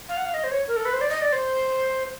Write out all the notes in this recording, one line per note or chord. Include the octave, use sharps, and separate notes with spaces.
F5
F#5
F5
D#5
C5
C#5
A#4
A4
B4
C5
D5
D#5
D5
C5